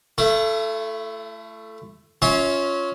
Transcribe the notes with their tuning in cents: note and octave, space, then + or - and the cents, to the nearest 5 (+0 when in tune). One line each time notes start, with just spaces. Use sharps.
A3 +0 E4 +40
C#4 +5 F4 +0 E5 -35